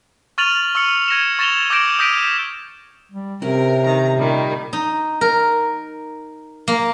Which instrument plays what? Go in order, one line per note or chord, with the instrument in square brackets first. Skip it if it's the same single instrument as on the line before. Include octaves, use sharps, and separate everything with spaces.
[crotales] C#6 F6 A6 D#7 F7 F#7
C#6 E6 F6 C#7
G#6 A#6 C#7 E7
C#6 A6 A#6 E7 F7 G7
D6 E6 G6 A#6 D7 E7
D#6 G6 A#6 B6 D7 D#7
[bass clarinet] G3
[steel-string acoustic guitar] A2 C4 C#4 [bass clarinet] C3 [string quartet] A#4
[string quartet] D#3 A#5
A#2 D#3 G3
[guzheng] D#4
A#4
A#3